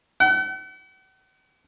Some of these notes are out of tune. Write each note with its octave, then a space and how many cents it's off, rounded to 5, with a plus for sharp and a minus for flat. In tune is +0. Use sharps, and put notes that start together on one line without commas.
F#5 +45